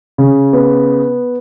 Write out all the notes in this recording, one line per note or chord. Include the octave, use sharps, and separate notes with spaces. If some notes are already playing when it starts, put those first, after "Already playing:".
C#3
B3